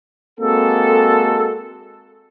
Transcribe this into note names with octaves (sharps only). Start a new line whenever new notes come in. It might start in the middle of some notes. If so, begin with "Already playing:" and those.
G#3 A#3 C4 F#4 A4